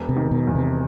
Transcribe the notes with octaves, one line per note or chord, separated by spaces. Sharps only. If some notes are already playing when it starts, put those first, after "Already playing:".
Already playing: E1
C3
D#3
B2
E2
C3